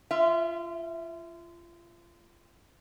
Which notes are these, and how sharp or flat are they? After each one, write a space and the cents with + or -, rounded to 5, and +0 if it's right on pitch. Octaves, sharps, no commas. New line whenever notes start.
F4 -30 E5 +0